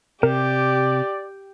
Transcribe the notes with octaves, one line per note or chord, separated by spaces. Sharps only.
C3 G4 A#4 D5